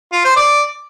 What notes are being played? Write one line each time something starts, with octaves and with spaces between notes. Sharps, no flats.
F4
C5
D5